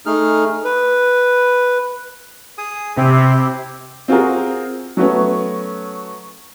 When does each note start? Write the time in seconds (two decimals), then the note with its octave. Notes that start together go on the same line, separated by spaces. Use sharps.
0.06 A3 D#4 G#4 F6
0.64 B4
2.58 G#4 D#6
2.97 C3 C4 E4 G4
4.08 C4 F4 F#4 G#4 A#4
4.97 F#3 A3 B3 C#4